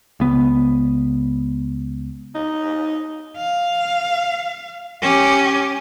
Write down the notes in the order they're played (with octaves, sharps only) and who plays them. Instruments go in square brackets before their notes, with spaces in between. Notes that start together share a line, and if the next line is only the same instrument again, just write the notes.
[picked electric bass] C#2 B3
[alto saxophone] D#4
[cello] F5
C#4 G4